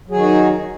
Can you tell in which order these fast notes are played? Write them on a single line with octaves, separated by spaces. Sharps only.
F#3 G#4 D#3 F#4 D#4